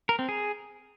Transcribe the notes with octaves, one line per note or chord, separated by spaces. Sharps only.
A#4
C4
G#4